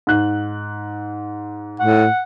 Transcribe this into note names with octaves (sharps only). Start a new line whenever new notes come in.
G#2 F#6
A2 F#5